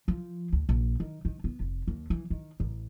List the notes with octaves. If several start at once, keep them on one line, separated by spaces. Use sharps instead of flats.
F3
D2
A#1
D#3
D#3
B3
F1
D#2
E3
D#3
A1